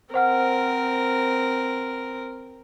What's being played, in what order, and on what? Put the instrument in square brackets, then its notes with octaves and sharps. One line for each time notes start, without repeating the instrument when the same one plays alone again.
[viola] C4 A#4 [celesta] C5 F#5 F6